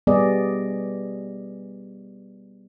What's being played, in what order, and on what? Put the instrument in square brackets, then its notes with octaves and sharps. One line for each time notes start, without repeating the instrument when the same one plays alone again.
[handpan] G3 B3 G#4 D5 D#5